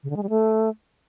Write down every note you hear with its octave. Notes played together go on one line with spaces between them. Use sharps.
C#3
D3
G#3
G3
A3